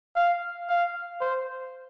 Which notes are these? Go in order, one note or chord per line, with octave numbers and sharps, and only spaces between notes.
F5
F5
C5